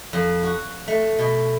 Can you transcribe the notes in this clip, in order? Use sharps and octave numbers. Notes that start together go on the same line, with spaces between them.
F2
F#4
A3
B2